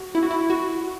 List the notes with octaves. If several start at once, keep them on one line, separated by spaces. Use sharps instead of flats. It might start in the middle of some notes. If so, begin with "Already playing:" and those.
Already playing: F#4
E4
F#4
E4
F#4